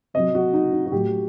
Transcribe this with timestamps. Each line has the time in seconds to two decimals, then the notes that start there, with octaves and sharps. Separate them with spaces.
0.14 C3 F#3 D#5
0.35 F#4
0.54 D#4
0.73 D#4
0.86 F#4
0.92 A2 F#3 G4